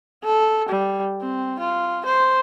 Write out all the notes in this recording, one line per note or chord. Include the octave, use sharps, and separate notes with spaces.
A4
G3
C4
F4
C5